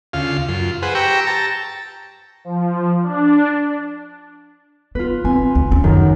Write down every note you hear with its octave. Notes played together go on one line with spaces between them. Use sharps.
D2 C#3 F4 F5
F#2 F4
G#4 B4 C5 F#5
G4 G5 A#5 C#6 E6
A5 A#5
F3
D4
B3 F4 B4
C4 G#5 C6
D2
C#4
F#2 D#3 F#3